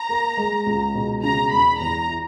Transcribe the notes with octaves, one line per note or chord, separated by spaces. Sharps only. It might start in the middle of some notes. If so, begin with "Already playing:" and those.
Already playing: A#5
A#3
G#3
C#2
B2
C#3 A#5
E1 B5
E2 A#5
E4